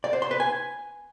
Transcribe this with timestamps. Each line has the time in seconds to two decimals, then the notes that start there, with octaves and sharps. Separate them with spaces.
0.04 D5
0.13 C5
0.22 C6
0.31 B4
0.40 G#5